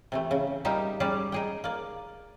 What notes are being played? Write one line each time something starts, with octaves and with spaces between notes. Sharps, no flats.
C3 E3 A3
C#3
G3 A#3 D#4 G4 E5 A#5
G3 C#4 G4 G#4 D5
D#4 G#4 G5
A#3 D5